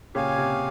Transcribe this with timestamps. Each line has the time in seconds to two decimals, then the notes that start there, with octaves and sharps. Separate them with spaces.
0.15 A#2 C#3 G4 C#5 F5 G#5
0.38 C3